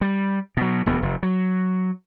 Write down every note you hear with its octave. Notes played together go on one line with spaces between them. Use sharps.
G3
B2 F#3
E1 D2 B3
F1
F#3